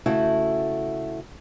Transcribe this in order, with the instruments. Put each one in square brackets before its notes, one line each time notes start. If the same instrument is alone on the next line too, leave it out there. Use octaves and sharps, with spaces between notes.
[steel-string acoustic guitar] C#3 A3 E4 F#4 A4